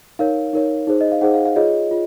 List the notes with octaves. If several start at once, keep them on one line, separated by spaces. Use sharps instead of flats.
D#4 A#4 C#5 F5
D#4 A#4 C#5
D#4 G#4 C5
D#5
F5
D#4 G#4 C5 F#5
F5
F5
F4 G#4 C#5 D#5
F4